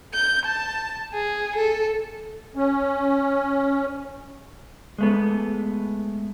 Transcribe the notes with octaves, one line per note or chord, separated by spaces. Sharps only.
G6
A5
G#4
A4
C#4
G#3 A3 B3